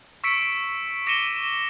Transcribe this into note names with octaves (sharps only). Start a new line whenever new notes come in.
C#6 E6 B6 C#7 D7
D6 A#6 C#7 D#7 E7 G7